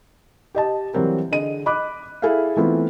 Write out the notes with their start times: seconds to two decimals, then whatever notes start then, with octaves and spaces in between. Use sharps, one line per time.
0.55 G4 D#5 A5
0.94 E3 F#3 G3 C4 A#4
1.31 D3 G#4 D#5 D#7
1.66 D#5 B5 D6 F#6
2.22 E4 G#4 A4 E5 F5
2.56 E3 A3 B3 C4 E4 F4